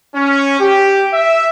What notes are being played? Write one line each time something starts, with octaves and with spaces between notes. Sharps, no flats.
C#4
G4
E5